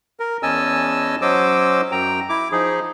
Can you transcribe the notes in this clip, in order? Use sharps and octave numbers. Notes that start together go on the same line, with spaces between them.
A#4
E2 C#4 D#5 G#5 A5 E6
F#3 C#4 C5 D#5 D6 E6
F#2 G5 A#5
E4 D6
F3 D#4 G#4